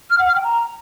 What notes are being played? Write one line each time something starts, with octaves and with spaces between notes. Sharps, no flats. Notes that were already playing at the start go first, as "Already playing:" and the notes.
F6
F#5
F6
G5
A#5